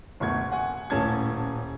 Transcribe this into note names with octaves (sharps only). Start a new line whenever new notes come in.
F#1 D2 B2 C#6 G#6
F#5 G#5
D#1 A2 C#4 G#5 A5 G#6